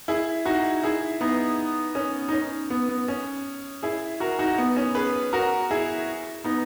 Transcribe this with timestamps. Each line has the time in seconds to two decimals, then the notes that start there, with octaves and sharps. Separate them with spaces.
0.08 E4 G#4
0.45 D#4 F#4
0.83 E4 G#4
1.21 B3 D#4
1.95 C#4
2.29 D#4
2.33 C#4
2.70 B3
2.89 B3
3.08 C#4
3.83 E4 G#4
4.20 F#4 A#4
4.39 D#4 F#4
4.58 B3
4.77 C#4
4.95 G#4 B4
5.33 F#4 A#4
5.71 E4 G#4
6.44 B3 D#4